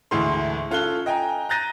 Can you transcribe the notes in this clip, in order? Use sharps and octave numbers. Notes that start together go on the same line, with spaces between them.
D2 A2 E3 G#3 C6
C#4 F4 A4 F#6 G7
D#5 G5 G#5 A#5
A#5 F#6 G6 A6 A#6 D#7